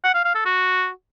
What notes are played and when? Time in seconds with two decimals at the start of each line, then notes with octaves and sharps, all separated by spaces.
0.04 F#5
0.14 F5
0.25 F5
0.35 A4
0.45 F#4